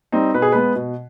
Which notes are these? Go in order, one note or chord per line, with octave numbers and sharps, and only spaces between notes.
G3 C4 D#4
B2 B4
G#4
G#3 B3 B4
B2